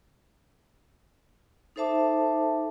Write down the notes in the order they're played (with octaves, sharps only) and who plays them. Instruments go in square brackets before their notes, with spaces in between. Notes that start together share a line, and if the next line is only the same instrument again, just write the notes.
[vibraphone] D#4 A4 C5 E5 A5 D6